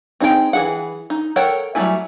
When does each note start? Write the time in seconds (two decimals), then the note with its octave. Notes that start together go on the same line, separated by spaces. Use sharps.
0.20 C4 D#4 G#4 A#4 G5
0.53 E3 G#4 F#5
1.10 D#4
1.36 A4 A#4 C#5 F#5 G5
1.75 F#3 G3 A3 E4 G#5